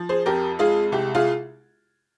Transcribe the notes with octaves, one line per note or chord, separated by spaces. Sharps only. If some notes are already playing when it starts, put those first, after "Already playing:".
Already playing: F3
G#4 C5
F2 G4 A#4
G#3 F4 G#4
C2 G4
F4 G#4